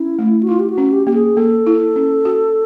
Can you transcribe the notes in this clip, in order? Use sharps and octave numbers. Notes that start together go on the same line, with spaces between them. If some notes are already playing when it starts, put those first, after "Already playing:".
Already playing: C#4 E4
A3
F#4
E4 F4
G4
F#4
C#4
G4
A#3 G4
G#4
A#3 A4
E4
C#4
F#4